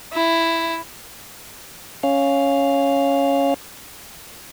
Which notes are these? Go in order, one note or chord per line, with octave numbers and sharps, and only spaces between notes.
E4
C#4 F5